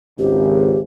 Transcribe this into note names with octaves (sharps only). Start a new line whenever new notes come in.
G#1 C#2 G4